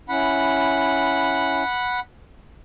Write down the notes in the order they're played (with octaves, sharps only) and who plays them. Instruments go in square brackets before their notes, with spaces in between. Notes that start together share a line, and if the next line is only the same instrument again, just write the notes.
[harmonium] C#4 E4 [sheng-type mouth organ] F#5 B5